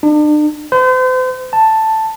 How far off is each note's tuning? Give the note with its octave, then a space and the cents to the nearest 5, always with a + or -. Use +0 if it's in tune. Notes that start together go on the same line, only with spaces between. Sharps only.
D4 +40
C5 -40
A5 +5